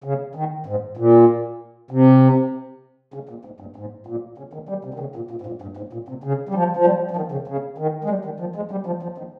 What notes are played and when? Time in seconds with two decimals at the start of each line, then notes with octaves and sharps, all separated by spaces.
0.04 C#3
0.35 D#3
0.66 G#2
0.97 A#2
1.91 C3
3.14 C#3
3.29 A#2
3.45 G#2
3.60 G2
3.76 G#2
4.07 A#2
4.38 C#3
4.53 D#3
4.69 G3
4.85 C3
4.94 D#3
5.00 C#3
5.16 A#2
5.31 A#2
5.42 G#2
5.46 A#2
5.62 G2
5.77 G#2
5.93 A#2
6.09 C3
6.24 C#3
6.49 G3
6.55 F3
6.77 F3
6.86 G3
7.11 F3
7.16 D#3
7.32 C#3
7.48 C#3
7.78 D#3
8.04 G#3
8.10 G3
8.25 D#3
8.40 F3
8.56 G#3
8.71 G3
8.86 F3
9.03 F3
9.18 D#3